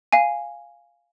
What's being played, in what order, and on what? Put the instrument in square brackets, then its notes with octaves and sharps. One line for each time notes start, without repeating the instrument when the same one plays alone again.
[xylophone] F5 G#5